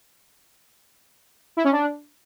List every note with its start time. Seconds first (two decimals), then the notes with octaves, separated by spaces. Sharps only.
1.57 E4
1.64 C#4
1.72 D4